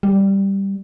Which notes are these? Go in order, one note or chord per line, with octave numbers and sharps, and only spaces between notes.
G3